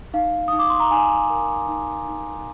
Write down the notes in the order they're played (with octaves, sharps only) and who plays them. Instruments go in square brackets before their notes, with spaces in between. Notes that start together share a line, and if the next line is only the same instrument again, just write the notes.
[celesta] D#4 F5
D#4 D#6
D6
C6
A#5
D#4 G#5
A#4
D#4
D#4